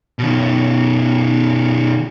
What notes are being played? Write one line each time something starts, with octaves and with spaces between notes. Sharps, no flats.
B2 D#3